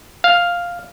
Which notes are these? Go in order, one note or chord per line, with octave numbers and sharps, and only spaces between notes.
F5